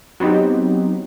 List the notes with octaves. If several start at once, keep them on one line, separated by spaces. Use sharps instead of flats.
F#3 B3 C4 D#4 G4